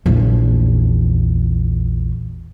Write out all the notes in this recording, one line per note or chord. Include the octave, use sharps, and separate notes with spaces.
A#1 E2